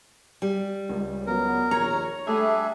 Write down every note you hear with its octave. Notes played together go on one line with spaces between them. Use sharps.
G3
C#2
F#3 B3 A#4
A#1 D#2 C#5 A#5
G3 A3 D4 G#4 E5